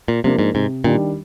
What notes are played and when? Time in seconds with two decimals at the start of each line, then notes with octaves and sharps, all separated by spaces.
0.08 A#2
0.24 C3 F3 A#3 D4
0.39 G#2
0.54 G#2 C3
0.84 A#2 D#3 G3 D4